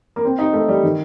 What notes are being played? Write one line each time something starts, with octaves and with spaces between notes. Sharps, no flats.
A#3
C4
D#4
A3
G3
D#3